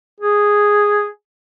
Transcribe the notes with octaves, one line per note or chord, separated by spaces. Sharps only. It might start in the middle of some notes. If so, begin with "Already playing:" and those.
G#4